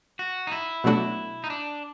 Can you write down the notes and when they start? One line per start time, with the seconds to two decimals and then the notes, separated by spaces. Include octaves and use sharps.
0.19 F#4
0.47 D#4
0.52 E4
0.84 B2 F#3 A3 D4 F#4
1.44 D#4
1.50 D4